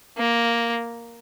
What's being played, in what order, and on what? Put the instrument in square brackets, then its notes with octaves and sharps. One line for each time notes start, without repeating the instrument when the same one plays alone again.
[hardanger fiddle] A#3